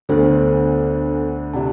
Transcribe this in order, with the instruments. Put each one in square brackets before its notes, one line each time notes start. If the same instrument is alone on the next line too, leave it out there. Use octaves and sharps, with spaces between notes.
[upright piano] D2 D3 [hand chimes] B3 D4 A4 C5
[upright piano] C3 [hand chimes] E4 G4 D5 F#5 A5